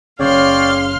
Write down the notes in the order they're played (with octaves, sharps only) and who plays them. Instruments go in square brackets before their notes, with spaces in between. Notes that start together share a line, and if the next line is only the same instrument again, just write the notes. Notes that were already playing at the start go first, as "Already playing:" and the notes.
[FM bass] F#1 [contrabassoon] C#3 [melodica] C#5 D5 G5 [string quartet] F5 C6 F6